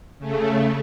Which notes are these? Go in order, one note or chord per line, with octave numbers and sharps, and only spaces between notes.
C#3 A3